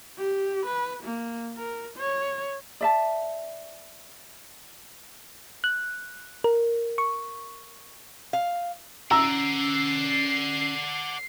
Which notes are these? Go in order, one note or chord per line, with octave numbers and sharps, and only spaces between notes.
G4
B4
A#3
A#4
C#5
D5 E5 A5
F#6
A#4
C#6
F5
C#4 D5 F#5 A#5 E6 C7